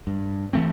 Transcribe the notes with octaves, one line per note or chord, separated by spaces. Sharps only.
G2
E3 A3 C4